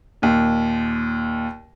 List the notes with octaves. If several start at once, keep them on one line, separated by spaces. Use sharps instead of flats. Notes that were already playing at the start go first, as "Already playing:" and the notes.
D#2 A#2